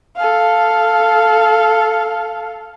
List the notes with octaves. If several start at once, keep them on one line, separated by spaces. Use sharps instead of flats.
A4 F5